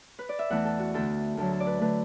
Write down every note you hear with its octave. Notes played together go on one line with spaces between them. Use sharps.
B4
D5
E5
E2 E3 A3 F#5
A4
F#4
D2 D3 A3 A4
D2 D3 F#3 A4
A4
D5
B4
D3 A3 B4